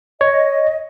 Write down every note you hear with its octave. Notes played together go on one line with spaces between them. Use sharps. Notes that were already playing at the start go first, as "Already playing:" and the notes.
C#5 D#5